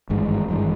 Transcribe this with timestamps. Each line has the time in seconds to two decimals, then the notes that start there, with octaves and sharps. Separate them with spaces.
0.10 G#1 G2 E3 G#3
0.48 G#1 G2 E3 G#3